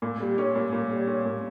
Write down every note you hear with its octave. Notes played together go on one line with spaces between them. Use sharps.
A#2
G3
C#4
A#2
A#2
G3
C#4
A#2